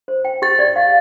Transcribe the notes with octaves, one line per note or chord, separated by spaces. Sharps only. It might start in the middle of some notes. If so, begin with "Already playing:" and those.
C5
G5
G4 A6
D5
F5